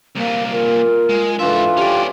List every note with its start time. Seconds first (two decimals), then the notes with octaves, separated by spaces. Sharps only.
0.16 C2 A#2 A#3
0.52 F4 A#4
1.10 G#3
1.39 G#2 E3 D4 F4 A4 B4 E5
1.77 C#4 G4 D5